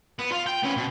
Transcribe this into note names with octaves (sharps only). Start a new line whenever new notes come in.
B3
F4
G5
B3 C#4
B2